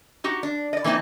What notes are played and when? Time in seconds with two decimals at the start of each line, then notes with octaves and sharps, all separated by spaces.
0.24 D#4 F#4 G4
0.43 D4
0.73 D5 D#5
0.84 E3 A#3 C4 D#4 A5